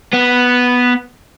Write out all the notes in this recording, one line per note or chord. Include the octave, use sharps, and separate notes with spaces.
B3